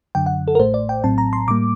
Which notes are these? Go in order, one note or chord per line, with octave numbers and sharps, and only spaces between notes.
F#2 D3 F#3 G5
F#5
A4
A#4
A1 A2 A3 C5
D5
G5
A#1 A2 F#3 C4 A5
A#5
C6
A2 G3 A#3 D6